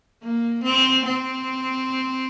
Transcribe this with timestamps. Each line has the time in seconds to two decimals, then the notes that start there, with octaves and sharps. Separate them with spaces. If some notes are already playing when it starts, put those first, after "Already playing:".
0.23 A#3
0.64 C4
1.06 C4